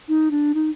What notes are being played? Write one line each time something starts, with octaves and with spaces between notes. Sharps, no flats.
D#4
D4
D#4